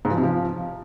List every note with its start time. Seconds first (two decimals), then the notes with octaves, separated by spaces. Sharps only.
0.05 G#2
0.11 F3
0.17 C3
0.23 F3